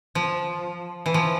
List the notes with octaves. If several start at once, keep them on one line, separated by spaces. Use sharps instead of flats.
F3
E3
F3